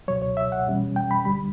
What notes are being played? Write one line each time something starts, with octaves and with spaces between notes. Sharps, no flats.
C#2 B2 F#3 C#5
C#5
E5
F#5
E2 B2 G3 C#4
G5
B5
D2 D3 G3 B5